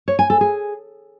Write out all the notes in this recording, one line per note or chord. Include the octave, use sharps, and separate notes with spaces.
C#5
G#5
A4
G#4